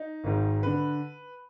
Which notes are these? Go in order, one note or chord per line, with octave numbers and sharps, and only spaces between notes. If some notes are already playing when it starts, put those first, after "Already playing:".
Already playing: D#4
G#1 G#2 D#3
D3 B4